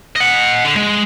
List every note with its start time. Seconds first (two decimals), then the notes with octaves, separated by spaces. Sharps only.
0.16 D#5 F#5
0.64 D3
0.76 G#3